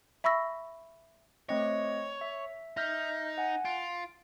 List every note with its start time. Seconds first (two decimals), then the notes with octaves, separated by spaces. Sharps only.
0.24 E5 B5 C#6 E6 A#6
1.49 A3 C4 C#5 D#5
2.21 E5
2.77 D#4 E5 F6 G6
3.38 F#5 G#5
3.65 F4 D7